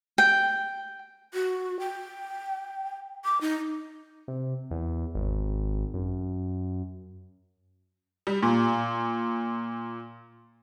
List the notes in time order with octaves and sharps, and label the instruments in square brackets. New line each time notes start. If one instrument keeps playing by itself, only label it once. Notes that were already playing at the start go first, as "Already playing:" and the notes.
[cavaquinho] G5
[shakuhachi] F#4
G5
D6
D#4
[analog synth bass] C3
E2
G#1
F#2
[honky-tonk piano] G3
A#2